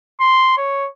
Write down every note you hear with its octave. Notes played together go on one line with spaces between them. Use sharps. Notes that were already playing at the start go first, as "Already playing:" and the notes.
C6
C#5